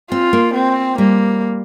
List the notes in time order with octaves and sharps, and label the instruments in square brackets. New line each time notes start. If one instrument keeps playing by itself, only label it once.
[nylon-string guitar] C4 [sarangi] F4
[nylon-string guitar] A#3
[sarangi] C4
[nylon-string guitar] G3 [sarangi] A#3